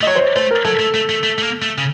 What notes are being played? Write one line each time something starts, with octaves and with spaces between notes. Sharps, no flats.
A3 D#5
F#3 C#5
C5
C#5
A3 C5
A#4
F#3 A4
A3
A3
A3
A3
A3
A#3
A3
C#3